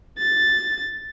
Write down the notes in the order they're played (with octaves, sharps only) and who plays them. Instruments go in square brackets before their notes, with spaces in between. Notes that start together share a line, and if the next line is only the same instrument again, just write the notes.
[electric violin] A6